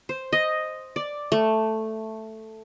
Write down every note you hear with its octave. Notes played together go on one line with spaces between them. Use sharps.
C5
D#5
D5
A3